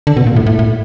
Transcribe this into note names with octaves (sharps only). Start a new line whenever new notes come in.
D3
B2
A#2
A2
A2
A2